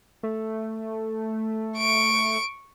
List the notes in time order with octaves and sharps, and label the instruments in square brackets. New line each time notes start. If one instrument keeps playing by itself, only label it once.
[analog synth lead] A3
[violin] C#6 D7